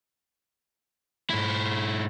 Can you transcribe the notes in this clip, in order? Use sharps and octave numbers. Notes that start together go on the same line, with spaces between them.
G#2 E4